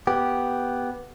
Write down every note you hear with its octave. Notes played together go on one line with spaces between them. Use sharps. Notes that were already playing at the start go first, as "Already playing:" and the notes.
B3 G4